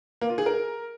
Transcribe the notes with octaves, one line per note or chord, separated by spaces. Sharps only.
A#3
F4
G#4
A#4